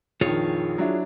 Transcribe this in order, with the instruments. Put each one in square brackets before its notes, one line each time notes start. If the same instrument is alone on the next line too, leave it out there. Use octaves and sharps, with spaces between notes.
[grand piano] A#1 F2 D#3 [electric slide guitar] F4 G#4 C#5
[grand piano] F#3 D4 E4